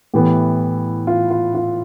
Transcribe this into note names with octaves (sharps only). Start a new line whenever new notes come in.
A2 E3 B3 G4
F4
F4
F4